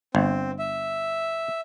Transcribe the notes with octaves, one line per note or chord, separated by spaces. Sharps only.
G1 C4
E5